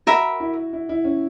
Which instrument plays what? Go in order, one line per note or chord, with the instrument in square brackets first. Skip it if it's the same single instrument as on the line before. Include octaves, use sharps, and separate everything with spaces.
[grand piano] F#4 [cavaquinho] A#4 E5 B5
[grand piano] E4
E4
E4
C#4